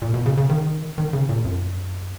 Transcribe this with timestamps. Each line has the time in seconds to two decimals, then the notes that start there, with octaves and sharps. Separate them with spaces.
0.02 A#2
0.14 B2
0.26 C#3
0.37 C#3
0.49 D#3
0.98 D#3
1.13 C#3
1.29 A#2
1.45 F#2